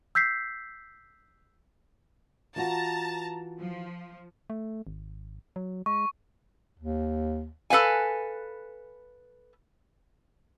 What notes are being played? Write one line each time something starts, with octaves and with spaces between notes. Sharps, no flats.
E6 G6 B6 C7
E3 F4 F#4 A5 A#5
F3
A3
G#1
F#3
G#3 C#6
D#2
A4 B4 F5 G#5